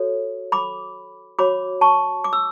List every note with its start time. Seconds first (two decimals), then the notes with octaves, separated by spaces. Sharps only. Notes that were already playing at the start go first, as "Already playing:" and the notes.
Already playing: F#4 A4 C#5
0.52 B5 D6
1.39 F#4 C#5 B5 D6
1.81 A5 C#6
2.24 D6
2.33 E6